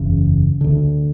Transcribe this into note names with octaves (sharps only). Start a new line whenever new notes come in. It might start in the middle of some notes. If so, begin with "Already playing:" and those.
Already playing: F#1 E2 C#3
D2 D3